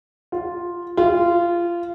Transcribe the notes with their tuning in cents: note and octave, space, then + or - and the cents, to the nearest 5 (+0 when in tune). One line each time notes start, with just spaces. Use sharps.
F4 +0
F4 -20